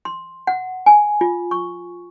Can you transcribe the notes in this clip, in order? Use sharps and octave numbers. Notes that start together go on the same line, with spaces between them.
C6
F#5
G#5
F4
C#6